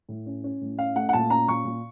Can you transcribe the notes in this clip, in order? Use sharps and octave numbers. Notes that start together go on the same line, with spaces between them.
A2
C#4
C#4
A2
C#4 F5
A3 F#5
F#5
A#2 A5
C#4 A#5
A#2 C#6
A#2